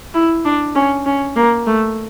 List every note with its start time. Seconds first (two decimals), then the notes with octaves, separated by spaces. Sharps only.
0.14 E4
0.45 D4
0.75 C#4
1.06 C#4
1.36 A#3
1.67 A3